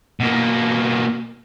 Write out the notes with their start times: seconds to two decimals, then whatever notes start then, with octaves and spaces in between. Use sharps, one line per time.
0.20 B2 A#3